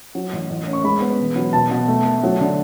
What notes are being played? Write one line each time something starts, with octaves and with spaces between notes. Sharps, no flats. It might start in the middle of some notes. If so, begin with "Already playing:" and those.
F#3
A1
A1
C#4
C#6
G#3 B5
B3
E1
F#3
B2 A5
B2
A3
A3
F#3
D3